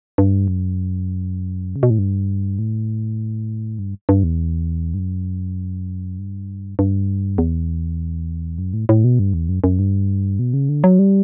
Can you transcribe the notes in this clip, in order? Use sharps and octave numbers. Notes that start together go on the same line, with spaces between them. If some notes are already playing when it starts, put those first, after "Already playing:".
G2
F#2
C#3
B2
A2
G2
A2
G2
G2
E2
G2
F#2
G2
G2
E2
F#2
A2
A2
B2
G2
E2
F#2
F#2
G2
B2
C#3
D3
F#3
G3